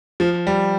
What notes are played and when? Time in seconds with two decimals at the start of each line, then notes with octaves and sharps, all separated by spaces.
0.20 F3
0.47 G3